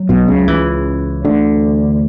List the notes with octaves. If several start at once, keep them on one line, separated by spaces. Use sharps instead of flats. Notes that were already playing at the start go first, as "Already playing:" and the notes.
Already playing: F#3
B1 B2
C#2 C#3
E3
D2 D3